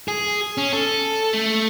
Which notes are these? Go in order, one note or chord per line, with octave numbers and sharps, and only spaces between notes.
G#4
C#4
A4
A3